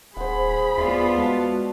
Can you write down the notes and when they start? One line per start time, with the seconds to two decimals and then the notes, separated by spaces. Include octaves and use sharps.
0.17 D#1 G#4 C5 F#5 B5
0.77 D#2 B3 F4 D5 E5
1.18 G#3 F#4 D5 A5